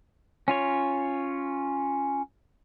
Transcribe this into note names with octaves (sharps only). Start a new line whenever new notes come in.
C#4 F4 C#5